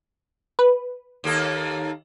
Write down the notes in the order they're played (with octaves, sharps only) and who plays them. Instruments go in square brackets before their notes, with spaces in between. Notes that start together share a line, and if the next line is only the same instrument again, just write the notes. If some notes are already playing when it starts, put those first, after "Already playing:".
[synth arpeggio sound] B4
[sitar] D#2 A#3 A4